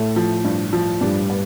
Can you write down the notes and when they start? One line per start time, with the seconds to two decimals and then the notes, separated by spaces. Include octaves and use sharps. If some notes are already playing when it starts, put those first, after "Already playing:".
Already playing: A2 A3
0.16 F3
0.45 G2
0.73 F3
1.01 G2 D4
1.30 B3